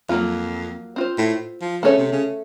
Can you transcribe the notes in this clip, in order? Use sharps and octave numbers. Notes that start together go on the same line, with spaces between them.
F2 F#3 A#3 F4
C4 F4 C5
A2
F3
C#3 A3 C#4 A4 C#5
C3
C#3